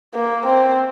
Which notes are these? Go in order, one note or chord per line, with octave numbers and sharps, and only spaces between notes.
A#3
C4